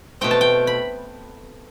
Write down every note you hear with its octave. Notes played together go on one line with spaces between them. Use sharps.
B2 A3 C4 G5
A5
G5
B5